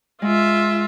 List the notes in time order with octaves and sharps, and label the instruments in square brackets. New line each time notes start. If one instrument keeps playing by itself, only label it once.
[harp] G#3 [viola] F4 E5